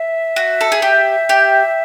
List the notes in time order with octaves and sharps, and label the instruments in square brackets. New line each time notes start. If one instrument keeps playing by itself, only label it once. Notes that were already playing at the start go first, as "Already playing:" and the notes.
Already playing: [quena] E5
[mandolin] F#4
A4
G#4
G4
G4